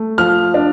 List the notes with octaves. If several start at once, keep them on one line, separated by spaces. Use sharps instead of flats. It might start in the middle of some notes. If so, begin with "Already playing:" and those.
Already playing: A3
F3 F6
D4